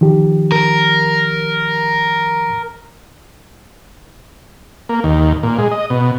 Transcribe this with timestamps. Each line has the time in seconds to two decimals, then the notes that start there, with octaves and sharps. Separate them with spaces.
0.01 D#3 F3 G4
0.52 A#4
4.89 A#3
5.04 D#2
5.43 A#2
5.59 G#3
5.71 D#5
5.90 B2